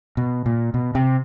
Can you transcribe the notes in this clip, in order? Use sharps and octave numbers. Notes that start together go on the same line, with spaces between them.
B2
A#2
B2
C3